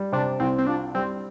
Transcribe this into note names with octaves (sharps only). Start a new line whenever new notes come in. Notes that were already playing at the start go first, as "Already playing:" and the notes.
Already playing: G3
C3 D4
C2 C4
C4
D4 F4
G3 C4